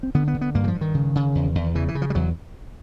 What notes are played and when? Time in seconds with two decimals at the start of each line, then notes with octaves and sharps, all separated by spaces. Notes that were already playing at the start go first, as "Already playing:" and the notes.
0.03 C4
0.15 D3 B3
0.28 B3
0.34 D3
0.41 B3
0.55 G2 A#3
0.64 E3
0.68 F3
0.75 G2
0.81 D#3
0.94 C#3
1.15 C#3
1.35 E2
1.55 E2
1.75 C#3 E3
1.88 E3
1.95 C#3
2.02 F3
2.10 G3
2.15 E2 F#3